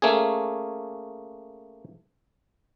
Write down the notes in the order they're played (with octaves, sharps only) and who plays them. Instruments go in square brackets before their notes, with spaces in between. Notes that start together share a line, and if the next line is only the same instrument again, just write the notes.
[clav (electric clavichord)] A3 A#3 C#4 G#4